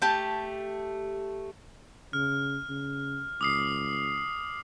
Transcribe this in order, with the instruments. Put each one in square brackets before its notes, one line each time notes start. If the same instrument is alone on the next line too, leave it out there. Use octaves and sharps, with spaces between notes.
[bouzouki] A3 G4 A5
[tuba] C#3 [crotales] F6
[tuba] C#3
[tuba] C#2 [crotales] D6 D#6 C7